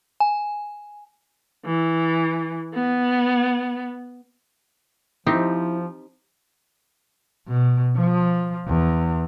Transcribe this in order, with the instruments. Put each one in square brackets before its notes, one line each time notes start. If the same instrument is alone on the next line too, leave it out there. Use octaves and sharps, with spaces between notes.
[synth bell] G#5
[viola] E3
B3
[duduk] F3 [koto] C4 D#4 G4 [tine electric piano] E4
[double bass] B2
F3
E2